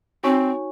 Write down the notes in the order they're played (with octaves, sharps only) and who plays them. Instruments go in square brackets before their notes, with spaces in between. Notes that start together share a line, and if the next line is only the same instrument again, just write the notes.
[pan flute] C4 [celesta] D#4 F#4 C#5 G#5 C#6